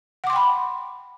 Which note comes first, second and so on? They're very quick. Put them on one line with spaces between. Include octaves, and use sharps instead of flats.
F#5 D6 C6 G5 B5